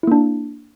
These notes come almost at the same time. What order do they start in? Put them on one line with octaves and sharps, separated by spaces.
E4 A#3 D4